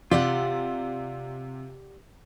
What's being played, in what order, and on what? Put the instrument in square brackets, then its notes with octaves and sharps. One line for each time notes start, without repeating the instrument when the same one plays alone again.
[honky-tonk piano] C3 [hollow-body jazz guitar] F4 [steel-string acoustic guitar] G4 D5 F#5